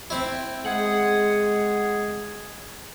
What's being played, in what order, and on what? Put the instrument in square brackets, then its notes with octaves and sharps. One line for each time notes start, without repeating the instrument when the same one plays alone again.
[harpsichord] C4 E4
[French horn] G#3 [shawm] G#4 [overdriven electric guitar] F#5